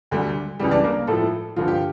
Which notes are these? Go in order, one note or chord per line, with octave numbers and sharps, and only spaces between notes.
D2 D3 G3
C#2 C#3 E3 G3 G4
D4 D5
A#3 A#4
A2 F3 A3 A4
G2 D3 F3 F4
G4